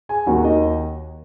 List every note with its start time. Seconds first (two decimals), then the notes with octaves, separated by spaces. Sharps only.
0.09 G#4 G#5
0.26 D#2 D#3 A#3 F#4 F#5
0.44 D#4 D#5